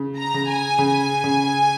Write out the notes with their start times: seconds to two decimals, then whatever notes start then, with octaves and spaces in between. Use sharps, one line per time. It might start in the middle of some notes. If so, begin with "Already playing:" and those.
Already playing: C#3
0.19 A#5
0.34 C#3
0.49 G#5
0.79 C#3
1.24 C#3